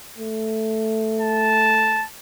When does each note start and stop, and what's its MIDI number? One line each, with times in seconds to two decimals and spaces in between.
0.18 2.04 57
1.21 2.06 81